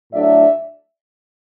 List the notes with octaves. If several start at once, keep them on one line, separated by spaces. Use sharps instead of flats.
A2 F#3 A3 D4 D5 E5